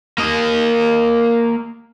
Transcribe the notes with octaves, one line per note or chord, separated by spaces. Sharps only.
A#3 D#5